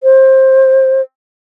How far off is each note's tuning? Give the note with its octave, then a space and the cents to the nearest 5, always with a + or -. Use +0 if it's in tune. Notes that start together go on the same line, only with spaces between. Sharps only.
C5 +20